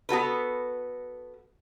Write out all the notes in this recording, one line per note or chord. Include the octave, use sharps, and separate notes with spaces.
B3 F#4 A4 B4